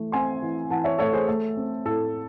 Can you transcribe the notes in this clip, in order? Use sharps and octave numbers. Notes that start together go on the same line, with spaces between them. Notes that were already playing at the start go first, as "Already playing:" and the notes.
Already playing: E3 A3
C4 G#5 C6
E3
E3 F#5 A5
C#5 E5
A3 A4 C#5
G#4 C5
A3 A4
C4
A2 A4